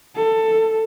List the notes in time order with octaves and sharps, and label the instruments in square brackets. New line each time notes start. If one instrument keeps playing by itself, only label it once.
[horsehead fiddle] A4